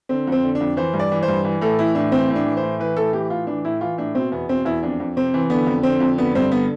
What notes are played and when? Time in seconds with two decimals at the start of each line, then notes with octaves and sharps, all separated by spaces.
0.09 D3 C4
0.27 F2 C4
0.43 D3
0.55 D4
0.60 F2
0.77 E3 C5
0.94 G2
0.99 D5
1.12 E3
1.23 C5
1.28 G2
1.45 E3
1.61 A2 A4
1.79 E3 E4
1.95 A2 D4
2.12 E3 C4
2.30 A2
2.35 D4
2.46 E3
2.57 C5
2.63 A2
2.79 E3 B4
2.97 A2 A4
3.13 E3 G4
3.30 A2 F4
3.47 E3 D4
3.64 A2 E4
3.81 E3 F4
3.98 A2 D4
4.15 B2 C4
4.32 E2 B3
4.48 B2 C4
4.65 E2 E4
4.83 F2 D4
5.00 F2
5.17 C3 C4
5.34 E3
5.50 D3 B3
5.67 F2
5.83 D3 C4
6.00 F2
6.18 D3 B3
6.35 G2 C4
6.52 D3 B3